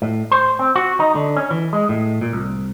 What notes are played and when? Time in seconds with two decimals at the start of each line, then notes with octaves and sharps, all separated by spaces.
0.02 A2
0.32 C5
0.59 C4
0.76 F#4
1.00 D#4
1.15 D3
1.37 C#4
1.51 E3
1.73 G#3
1.89 A2
2.21 A#2
2.33 C2